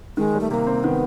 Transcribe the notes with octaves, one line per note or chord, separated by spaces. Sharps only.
D#3 G#3
G3
A3
C3 A#3
C4
D#3 B3